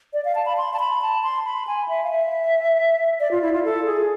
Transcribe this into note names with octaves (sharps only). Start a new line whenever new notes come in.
D5
F5
A5
B5
C6
A5
B5
A5
C6
B5
G#5
E5
F5
E5
D5
F4
E4
F4
A4
G#4